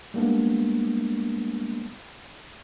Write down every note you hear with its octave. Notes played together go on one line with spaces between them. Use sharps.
G3 G#3 A#3 B3 D4